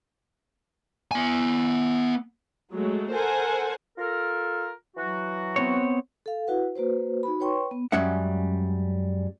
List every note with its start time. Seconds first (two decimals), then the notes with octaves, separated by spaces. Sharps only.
1.11 B3 G#5
2.73 F#3 G#3 A3
3.12 A4 A#4 C5 F#5 G#5
3.98 F4 A4 A#4
4.97 E3 F#3 F#4
5.56 B3 C4 C#5
6.26 A4 F5
6.47 E4 F#4 B4 F#5
6.76 A#3 F#4 B4 C5
7.23 D#4 F#4 B5
7.40 B4 C#5 G5 C6 C#6
7.71 B3
7.92 F#2 G3 G#3 C#4 E5 F#5